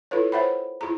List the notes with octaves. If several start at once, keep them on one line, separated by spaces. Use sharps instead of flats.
E4 F4 A4 B4 C#5
C5 C#5 E5 F#5 G5 B5
E4 F4 G#4 A#5